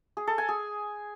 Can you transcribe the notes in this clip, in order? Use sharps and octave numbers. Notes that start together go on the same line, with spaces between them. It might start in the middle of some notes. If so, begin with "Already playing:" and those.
G#4
A4
G#5
G#4